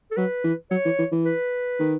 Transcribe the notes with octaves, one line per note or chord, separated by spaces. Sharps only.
A4
F#3 B4
E3
F#3 C#5
E3
E3
E3
B4
D#3